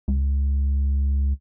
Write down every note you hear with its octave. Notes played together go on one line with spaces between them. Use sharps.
C#2